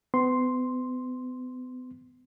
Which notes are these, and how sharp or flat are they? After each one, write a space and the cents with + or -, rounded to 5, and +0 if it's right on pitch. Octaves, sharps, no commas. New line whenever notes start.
B3 +40 C6 +0